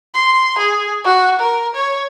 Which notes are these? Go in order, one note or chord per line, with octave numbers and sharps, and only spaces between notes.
C6
G#4
F#4
A#4
C#5